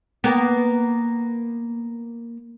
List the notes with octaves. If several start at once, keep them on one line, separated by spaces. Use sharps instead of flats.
A#3 B3